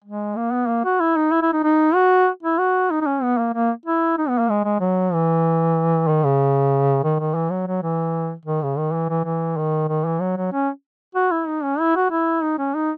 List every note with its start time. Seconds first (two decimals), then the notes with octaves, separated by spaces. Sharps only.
0.04 G#3
0.36 A#3
0.52 B3
0.68 A#3
0.85 F#4
1.00 E4
1.17 D#4
1.32 E4
1.42 E4
1.53 D#4
1.64 D#4
1.95 F#4
2.43 E4
2.58 F#4
2.91 D#4
3.01 D#4
3.06 C#4
3.23 B3
3.38 A#3
3.54 A#3
3.86 E4
4.18 D#4
4.29 B3
4.38 A#3
4.49 G#3
4.65 G#3
4.80 F#3
5.13 E3
6.08 D#3
6.24 C#3
7.04 D#3
7.20 D#3
7.35 E3
7.50 F#3
7.67 F#3
7.82 E3
8.46 D#3
8.63 C#3
8.77 D#3
8.94 E3
9.10 E3
9.25 E3
9.57 D#3
9.89 D#3
10.05 E3
10.21 F#3
10.37 F#3
10.52 C#4
11.15 F#4
11.31 E4
11.48 D#4
11.63 C#4
11.79 E4
11.96 F#4
12.11 E4
12.43 D#4
12.58 C#4
12.75 D#4